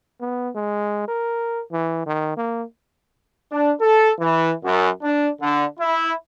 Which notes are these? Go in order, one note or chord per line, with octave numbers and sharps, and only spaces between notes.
B3
G#3
A#4
E3
D#3
A#3
D4
A4
E3
F#2
D4
D3
E4